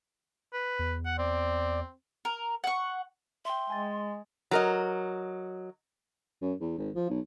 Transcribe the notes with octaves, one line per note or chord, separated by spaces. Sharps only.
B4
E2
F#5
C4 D5
A#4
F#5 C#6
E5 G5 C6
G#3 G#5 A6
F#3 A#4 D#5
F#2
E2
G#1
F3
B1